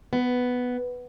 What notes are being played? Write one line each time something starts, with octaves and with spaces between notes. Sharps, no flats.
B3